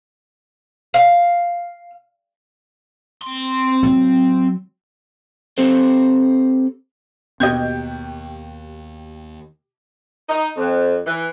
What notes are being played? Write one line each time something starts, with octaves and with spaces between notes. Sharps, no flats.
F5
C4 C6
F#3
C4 G4 A4 C5
D#2 B2 G4 D#5 G6 G#6
D#4
F2
E3